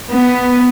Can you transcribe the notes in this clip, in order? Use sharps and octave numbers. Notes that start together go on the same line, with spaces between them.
B3